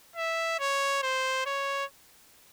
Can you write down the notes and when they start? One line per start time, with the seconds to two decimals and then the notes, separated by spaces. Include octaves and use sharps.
0.16 E5
0.59 C#5
1.02 C5
1.46 C#5